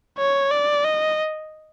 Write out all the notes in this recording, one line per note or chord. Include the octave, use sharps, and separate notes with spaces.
C#5
D5
D#5